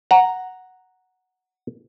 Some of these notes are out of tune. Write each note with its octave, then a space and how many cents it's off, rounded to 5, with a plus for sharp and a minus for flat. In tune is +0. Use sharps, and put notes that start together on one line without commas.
F#5 +0 A#5 +0